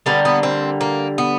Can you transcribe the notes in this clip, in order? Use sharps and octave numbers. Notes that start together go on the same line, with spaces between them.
D3 G3 A#3 B3
B3
C4
A#3
B3